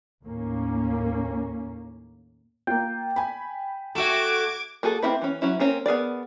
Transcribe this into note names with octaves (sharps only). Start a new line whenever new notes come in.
D#2 A2 A#3 C#4
A#3 F4 G5
G#5 B5
A3 F#4 E5 D6 G#6 E7
A#3 F#4 G#4 A4
A#3 C4 D#4 E4 B4
E3 C#4
F#3 C#4 E4
A#3 C4 C#4 A#4
B3 G#4 A#4 D5